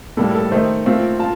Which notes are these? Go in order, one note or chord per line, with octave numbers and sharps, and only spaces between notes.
A2 G3 A#3 A4
A4
D#3 A3 D#4 C5
A#2 A3 C4 F4
F4 A5